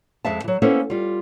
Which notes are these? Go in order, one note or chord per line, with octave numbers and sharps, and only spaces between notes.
F2 G#3 C4 E5 F5 A5
E3 F#3
A#3 B3 C#4 E4 A4 C5
G3 F4